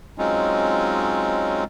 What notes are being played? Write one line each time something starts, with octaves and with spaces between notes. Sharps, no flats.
F#3 G#3 C4 C#4 D#4 F4